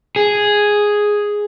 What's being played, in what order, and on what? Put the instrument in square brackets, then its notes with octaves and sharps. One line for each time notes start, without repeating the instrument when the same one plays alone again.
[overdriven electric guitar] G#4